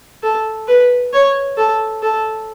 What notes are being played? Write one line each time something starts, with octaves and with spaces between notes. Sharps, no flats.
A4
B4
C#5
A4
A4